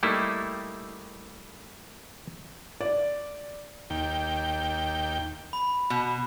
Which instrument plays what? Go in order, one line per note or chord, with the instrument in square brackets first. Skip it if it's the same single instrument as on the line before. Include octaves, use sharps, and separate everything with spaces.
[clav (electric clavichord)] G3 A3 A#3 D#4 E4
[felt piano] D5
[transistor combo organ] D#2 G5
[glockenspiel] B5
[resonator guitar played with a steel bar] B2